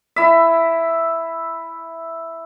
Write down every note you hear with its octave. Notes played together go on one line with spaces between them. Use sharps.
E4 E5